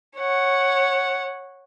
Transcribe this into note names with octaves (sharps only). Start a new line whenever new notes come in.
C#5 F#5